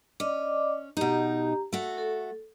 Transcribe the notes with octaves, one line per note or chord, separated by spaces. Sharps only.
C#4 D5 D#5 D6
B2 D#4 G4 A#5
A3 F#4
A4